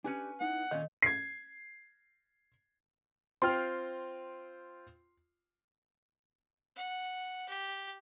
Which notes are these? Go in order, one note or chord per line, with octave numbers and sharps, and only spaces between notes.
C#4 D4 G4 A4 B4 G#5
B3 D#4 E4 F#5
A#2 D#3 C#4 A4 C#5 F5
G#6 C7
C4 F4 G5 C6 F6
F#5
G4